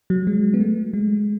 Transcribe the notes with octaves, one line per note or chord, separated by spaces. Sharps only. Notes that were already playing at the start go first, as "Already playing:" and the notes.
F#3
G#3
B3
A3
G#3